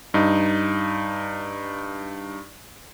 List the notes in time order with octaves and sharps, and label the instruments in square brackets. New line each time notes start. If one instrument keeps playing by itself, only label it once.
[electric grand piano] G2 D#4